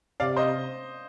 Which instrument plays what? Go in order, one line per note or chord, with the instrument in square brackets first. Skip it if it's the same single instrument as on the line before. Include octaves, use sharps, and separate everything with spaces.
[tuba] C3 [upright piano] D5 F5
[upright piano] C5 D#5